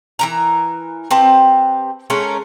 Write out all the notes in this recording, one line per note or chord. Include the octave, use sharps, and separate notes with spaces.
E3 A#4 A#5
C4 G4 B4 A5
G#3 A3 C#4 A#4